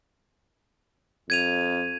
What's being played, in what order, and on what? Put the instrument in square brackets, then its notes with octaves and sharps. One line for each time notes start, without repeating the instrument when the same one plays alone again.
[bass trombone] F2 [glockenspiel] G#6 D#7 F7